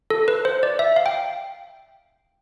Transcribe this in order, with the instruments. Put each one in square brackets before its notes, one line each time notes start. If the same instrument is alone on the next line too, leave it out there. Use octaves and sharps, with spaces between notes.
[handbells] A4
B4
C5
D5
E5
F5
G5